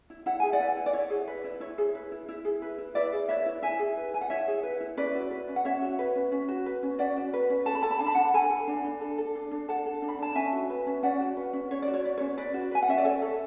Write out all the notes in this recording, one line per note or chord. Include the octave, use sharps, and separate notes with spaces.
E4
E4 F#5
G#4 G#5
D5 F#5
B4
E4
D5
E4 C#5
G#4
B4
E4
E4 C#5
G#4
B4
E4
E4
G#4
B4
E4
E4 B4 D5
G#4
B4 C#5 E5
E4
E4 E5 G#5
G#4
B4
E4 G#5
F#5
E4 C#5 E5
G#4
B4
E4
C#4 B4 D5
F#4
B4
C#4
F#5
C#4 C#5 E5
F#4
B4
C#4
C#4
F#4
B4
C#4
C#4 D5 F#5
F#4
B4
C#4
A4 A5
B5
A4 A5
B5
D4 A5
B5
D4 F#5 A5
A4 G#5 B5
A4
D4
D4
A4
A4
D4
D4
A4 F#5 A5
A4
D4
B5
D4 A5
C#4 E5 G#5
F#4
B4
C#4
C#4 D5 F#5
F#4
B4
C#4
C#4 C#5
D5
F#4
C#5
B4 D5
C#5
C#4
C#4 B4 D5
F#4
B4 G#5
F#5
C#4 E5
D5
A4 C#5
A4